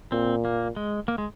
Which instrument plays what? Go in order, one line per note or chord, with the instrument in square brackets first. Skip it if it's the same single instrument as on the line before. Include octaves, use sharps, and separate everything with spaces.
[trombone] A#2 [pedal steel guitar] C4
[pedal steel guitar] A#3
G#3
A#3
G#3